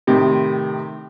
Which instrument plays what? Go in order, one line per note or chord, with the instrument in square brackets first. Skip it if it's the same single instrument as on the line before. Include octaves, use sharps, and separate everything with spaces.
[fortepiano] A2 C3 D#3